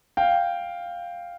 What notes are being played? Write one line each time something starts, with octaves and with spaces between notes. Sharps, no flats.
F5 G5